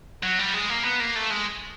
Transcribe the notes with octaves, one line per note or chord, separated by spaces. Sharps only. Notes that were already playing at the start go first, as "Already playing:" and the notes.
F#3
G3
G#3
A#3
B3
A#3
A3
G#3